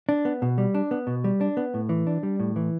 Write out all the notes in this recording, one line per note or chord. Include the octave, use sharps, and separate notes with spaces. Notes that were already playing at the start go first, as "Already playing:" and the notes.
D4
B3
B2
G3
D4
B3
B2
G3
D4
B3
A2
E3
D4
G3
A2
E3